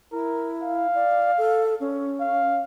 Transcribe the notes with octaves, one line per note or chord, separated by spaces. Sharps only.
E4 A#4
F5
D5
A4
C#4
F5